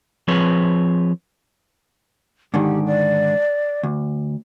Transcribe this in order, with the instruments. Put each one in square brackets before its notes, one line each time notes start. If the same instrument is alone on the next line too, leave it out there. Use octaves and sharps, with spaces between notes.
[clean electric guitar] F3 C4 G#4 B4 C#5
[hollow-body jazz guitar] G#2 D3 D#3 [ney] G4
[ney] D5
[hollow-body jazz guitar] D2